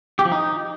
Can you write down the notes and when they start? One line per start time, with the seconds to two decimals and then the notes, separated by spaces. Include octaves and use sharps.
0.19 G4
0.25 F3
0.32 D#4